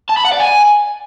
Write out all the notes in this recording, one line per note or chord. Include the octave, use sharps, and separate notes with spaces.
A5
B5
F#5
D5
G#5